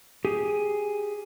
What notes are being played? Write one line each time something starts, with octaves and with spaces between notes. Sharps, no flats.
G4 G#4